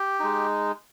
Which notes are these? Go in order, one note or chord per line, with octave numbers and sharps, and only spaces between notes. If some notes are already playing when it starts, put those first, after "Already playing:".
Already playing: G4
G#3 D#4